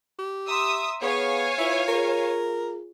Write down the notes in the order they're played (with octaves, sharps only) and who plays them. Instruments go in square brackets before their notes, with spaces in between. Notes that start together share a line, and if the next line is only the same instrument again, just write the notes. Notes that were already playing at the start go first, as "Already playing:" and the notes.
[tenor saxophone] G4
[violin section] E5 D#6 E6 [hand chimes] A#5 C6
[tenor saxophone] B3 [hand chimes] G#4 [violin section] C#5 F5 G#5
[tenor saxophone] E4 [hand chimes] F4 B4
[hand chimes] F4 G#4 [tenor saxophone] A#4